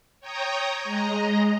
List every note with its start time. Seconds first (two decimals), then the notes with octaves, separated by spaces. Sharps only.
0.21 C#5 G5 A#5 D#6
0.83 G#3 D#5 A#5